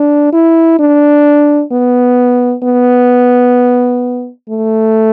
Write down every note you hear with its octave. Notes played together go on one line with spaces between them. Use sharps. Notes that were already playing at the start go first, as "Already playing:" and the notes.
Already playing: D4
E4
D4
B3
B3
A3